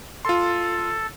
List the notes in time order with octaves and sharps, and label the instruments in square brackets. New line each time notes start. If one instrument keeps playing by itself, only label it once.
[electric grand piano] F4 C6 [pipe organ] A4